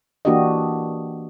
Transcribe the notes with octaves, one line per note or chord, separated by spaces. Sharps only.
E3 A#3 D4 F#4 G4 D#5